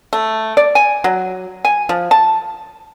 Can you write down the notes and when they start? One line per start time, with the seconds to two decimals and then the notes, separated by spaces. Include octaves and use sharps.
0.13 A3
0.57 D5
0.75 G#5
1.04 F#3
1.65 G#5
1.89 F3
2.11 A5